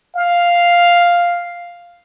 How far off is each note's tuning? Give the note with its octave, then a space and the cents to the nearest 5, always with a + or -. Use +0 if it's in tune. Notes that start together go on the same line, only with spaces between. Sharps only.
F5 +0